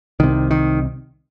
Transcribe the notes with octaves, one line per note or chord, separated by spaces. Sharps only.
C2 C3 D#3
D#3